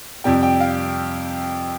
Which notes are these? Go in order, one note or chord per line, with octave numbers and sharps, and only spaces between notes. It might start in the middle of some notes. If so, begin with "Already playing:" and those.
F2 C3 G3 G5
G5
F5